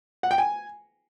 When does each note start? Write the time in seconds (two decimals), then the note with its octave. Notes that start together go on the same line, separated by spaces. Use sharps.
0.23 F#5
0.31 G5
0.38 G#5